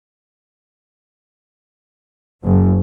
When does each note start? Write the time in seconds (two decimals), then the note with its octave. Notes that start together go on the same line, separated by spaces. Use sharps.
2.44 F#1